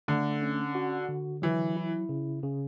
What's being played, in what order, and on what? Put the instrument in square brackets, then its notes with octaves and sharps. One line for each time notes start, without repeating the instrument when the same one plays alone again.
[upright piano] D3 [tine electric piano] A3
[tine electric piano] C#4
F#4
D3
[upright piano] E3 [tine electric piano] F#3
[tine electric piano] E4
C#3
C#3